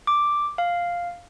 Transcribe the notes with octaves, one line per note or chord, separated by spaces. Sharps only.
D6
F5